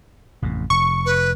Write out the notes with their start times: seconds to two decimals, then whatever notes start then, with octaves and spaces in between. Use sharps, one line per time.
0.42 A1 F2 C3
0.70 F1 C#6
1.06 B4